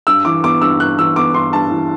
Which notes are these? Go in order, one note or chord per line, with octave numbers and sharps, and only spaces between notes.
G2 E6
E3 D6
B3 D6
G2 E6
G2 F#6
E3 E6
B3 D6
G2 C6
G2 A5
E3